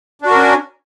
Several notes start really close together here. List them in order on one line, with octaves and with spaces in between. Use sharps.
D4 F#4 A#4 C#4